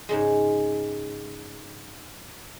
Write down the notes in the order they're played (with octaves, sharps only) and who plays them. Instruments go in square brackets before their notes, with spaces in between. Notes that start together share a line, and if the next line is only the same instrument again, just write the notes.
[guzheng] G#2 C#3 G#3